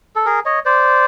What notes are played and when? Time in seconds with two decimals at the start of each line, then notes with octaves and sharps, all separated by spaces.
0.16 A4
0.26 G#4 A#4
0.46 C#5 D#5
0.65 C5 D5